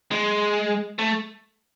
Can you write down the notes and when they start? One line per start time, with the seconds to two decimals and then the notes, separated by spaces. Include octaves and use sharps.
0.11 G#3
0.99 A3